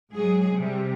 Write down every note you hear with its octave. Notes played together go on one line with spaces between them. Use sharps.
G#2 F#3 G#4
C3 G3